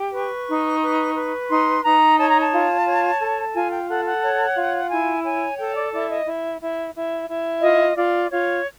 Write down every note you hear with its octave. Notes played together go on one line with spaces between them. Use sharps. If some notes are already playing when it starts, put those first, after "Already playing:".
Already playing: G4
B4 C#6
D#4
B4
B4
D#4 C6
D#4 A#5
C#5 A5
A#5
A5
F4
C#5
A4
F4 G#5
G5
A4 F#5
F#5
C#5
F4
E4 G#5
C#5 G#5
A4 G5
D5
E4 D5
D#5
E4
E4
E4
E4
F4 D#5
F4 D5
F4 C#5